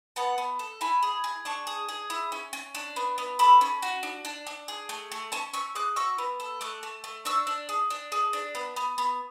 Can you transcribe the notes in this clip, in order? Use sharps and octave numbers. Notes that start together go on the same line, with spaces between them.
B3 F#5 A5
B3
A4
E4 G#5 B5
G#4
G#4
D4 A5 C#6
G#4
G#4
E4
C#4
C#4
D4
B3
B3
A4 B5 D6
C#4
F#4
D4
D4
D4
G#4
A3
A3
C#4 A5 C#6
C#4 C#6 E6
G#4 D6 F#6
F#4 C#6 E6
B3
A4
A3 D6 F#6
A3
A3
D4 C#6 E6
D4
G#4
D4
G#4
D4
B3
B3
B3